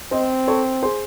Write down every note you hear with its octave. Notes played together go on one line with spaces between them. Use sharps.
C4 C5 D#5
A4 C#5
G#4 C5